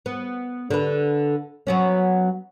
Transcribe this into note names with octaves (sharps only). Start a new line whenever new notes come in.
B3
D3 B4
F#3 B3 C#4